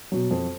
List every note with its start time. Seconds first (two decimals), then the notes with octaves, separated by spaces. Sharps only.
0.12 B2 F#3
0.31 F2